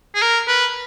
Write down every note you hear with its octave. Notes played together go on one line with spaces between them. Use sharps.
G#4
A#4
B4